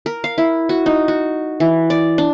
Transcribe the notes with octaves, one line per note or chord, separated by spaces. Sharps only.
A#4
F5
E4
F#4
D#4
F#4
E3
D5
D4